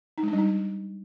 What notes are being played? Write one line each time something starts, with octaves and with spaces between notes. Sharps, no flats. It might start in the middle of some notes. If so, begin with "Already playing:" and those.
D#4
G#3
D4
G3
D#4